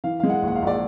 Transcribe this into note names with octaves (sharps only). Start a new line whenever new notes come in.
E3 F5
G#3 F5
F#5
A#1
F#5
F5
A#1 D5